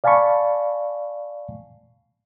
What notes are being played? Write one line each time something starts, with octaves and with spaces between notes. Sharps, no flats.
D5 F5 G#5 A5 B5 C#6